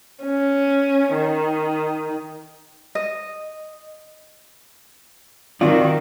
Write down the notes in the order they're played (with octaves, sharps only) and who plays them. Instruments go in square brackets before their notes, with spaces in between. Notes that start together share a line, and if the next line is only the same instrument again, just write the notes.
[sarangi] C#4
D#3
[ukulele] D#5
[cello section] D#3 [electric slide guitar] C4 D#4 D5 [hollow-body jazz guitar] F4 F#4